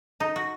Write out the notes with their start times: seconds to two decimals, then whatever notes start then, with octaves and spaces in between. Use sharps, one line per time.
0.20 D#4
0.36 F#4